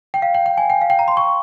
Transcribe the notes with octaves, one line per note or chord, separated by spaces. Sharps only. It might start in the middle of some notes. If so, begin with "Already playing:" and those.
G5
F5
G5
G5
G#5
G5
F5
G5
A#5
C6
C#6